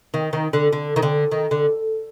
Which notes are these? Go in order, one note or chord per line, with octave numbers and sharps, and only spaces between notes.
D#3
D#3
D3
D3
D#3
D3
D#3
D3